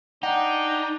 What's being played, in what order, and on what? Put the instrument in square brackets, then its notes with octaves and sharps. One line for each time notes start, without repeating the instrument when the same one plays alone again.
[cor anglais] D4 [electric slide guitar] D#4 [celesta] F#5 [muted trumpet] G5